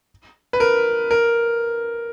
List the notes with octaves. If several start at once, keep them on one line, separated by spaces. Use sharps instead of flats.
B4
A#4
A#4